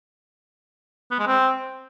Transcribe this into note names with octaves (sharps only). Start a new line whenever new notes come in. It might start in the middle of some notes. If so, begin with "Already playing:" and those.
B3
G#3
C4